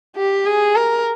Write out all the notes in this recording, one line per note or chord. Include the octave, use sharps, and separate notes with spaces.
G4
G#4
A#4